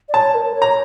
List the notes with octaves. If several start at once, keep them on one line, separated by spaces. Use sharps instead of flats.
D5
C#5 A5
A#4
C#5
A#5